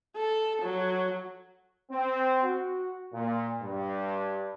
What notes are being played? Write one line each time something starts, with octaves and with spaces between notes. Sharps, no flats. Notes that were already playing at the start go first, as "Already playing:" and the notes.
A4
F#3
C4
F#4
A#2
G2